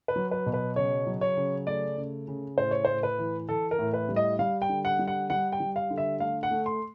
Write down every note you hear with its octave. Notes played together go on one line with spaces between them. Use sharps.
B4
F#3
B4
B2
B4
C#3 C#5
F#3
C#5
C#3
A3 D5
C#3
C#3
A2 C5
C#5
A2 C5
B4
E3
E3 A4
A#4
A2
B4
G3
D#5
G3 F5
G5
D3
F#5
G3
F#5
G3 F#5
G5
G3
F5
D3
E5
A3 F5
F#5
A3
C6